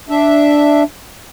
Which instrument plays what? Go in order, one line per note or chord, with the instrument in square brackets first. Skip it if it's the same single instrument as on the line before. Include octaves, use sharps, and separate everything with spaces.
[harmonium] D4 E5